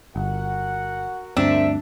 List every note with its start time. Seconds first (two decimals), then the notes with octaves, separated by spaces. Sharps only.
0.16 G1 F#4 A#4 F#5
1.37 D2 G2 C4 D4 A#4 C5 E5